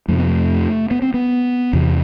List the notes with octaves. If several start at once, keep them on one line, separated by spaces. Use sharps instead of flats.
F2 C3 A3
B3
A3
B3
C4
B3
E2 C3